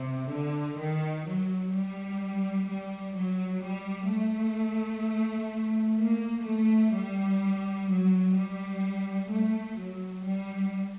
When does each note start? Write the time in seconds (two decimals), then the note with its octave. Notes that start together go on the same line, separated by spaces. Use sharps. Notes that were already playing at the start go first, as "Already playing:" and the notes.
Already playing: C3
0.31 D3
0.78 D#3
1.26 F#3
1.72 G3
2.67 G3
3.14 F#3
3.61 G3
4.09 A3
5.98 A#3
6.45 A3
6.93 G3
7.88 F#3
8.35 G3
9.29 A3
9.76 F#3
10.24 G3